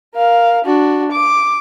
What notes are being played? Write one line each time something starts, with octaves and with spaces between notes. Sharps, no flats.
A#4 F5
D4 F#4
D6